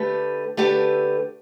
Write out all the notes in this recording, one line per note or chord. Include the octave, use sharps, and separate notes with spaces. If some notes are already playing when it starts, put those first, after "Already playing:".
Already playing: D3 A3 G4 B4
D3 A3 G4 B4